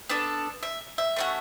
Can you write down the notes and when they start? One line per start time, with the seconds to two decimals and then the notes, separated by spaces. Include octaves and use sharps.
0.09 B3 D4 A4
0.63 E5
0.98 E5
1.16 A3 C#4 F#4